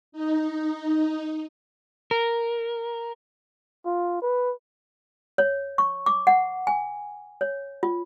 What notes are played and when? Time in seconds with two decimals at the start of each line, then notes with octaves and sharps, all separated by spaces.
0.12 D#4
2.11 A#4
3.86 F4
4.22 B4
5.38 C#5
5.78 C#6
6.06 D6
6.27 F#5
6.67 G#5
7.41 C#5
7.83 F4